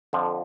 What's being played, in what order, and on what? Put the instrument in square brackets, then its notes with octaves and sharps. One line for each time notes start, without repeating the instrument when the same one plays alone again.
[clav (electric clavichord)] F2 D3 F3